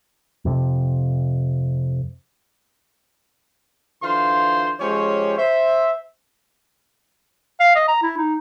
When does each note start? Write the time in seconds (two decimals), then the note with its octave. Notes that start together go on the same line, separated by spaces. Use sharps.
0.45 F2 C3
4.03 D3 E3 F4 C5 F5 C6
4.80 F3 G#3 C#4 G4 C5 C#5
5.38 C5 E5
7.60 F5
7.75 D#5
7.88 A#5
8.02 E4
8.17 D#4